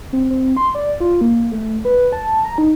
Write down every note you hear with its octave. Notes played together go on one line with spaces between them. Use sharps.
C4
C4
C6
D5
F4
A#3
A3
B4
A5
A#5
D#4